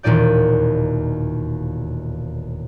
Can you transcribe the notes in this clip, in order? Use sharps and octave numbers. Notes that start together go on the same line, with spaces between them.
E1 D#2 A#2 D#4 D5 G6